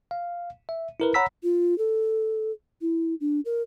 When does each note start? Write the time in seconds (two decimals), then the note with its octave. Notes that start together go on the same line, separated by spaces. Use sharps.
0.11 F5
0.69 E5
1.00 E4 A#4 B4
1.14 C#5 F#5 A#5 B5 E6 B6
1.43 F4
1.78 A4
2.81 E4
3.21 D4
3.45 A#4